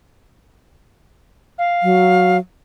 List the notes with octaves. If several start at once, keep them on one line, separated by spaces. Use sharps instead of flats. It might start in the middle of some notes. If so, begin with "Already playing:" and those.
F5
F#3